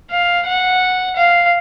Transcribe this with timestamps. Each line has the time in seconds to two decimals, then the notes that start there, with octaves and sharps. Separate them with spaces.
0.11 F5
0.46 F#5
1.16 F5